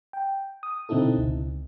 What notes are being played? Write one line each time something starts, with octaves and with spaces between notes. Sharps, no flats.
G5
D#6
B2 D3 C4 D#4 E4 A4
C#2